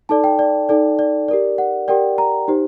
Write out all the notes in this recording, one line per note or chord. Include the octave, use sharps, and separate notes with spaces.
D#4 A4 D5 A5
G5
D5
D#4 A4 D5
D5
G4 A#4 D5
F#5
G4 A#4 D5 G5
A#5
D#4 G4 C5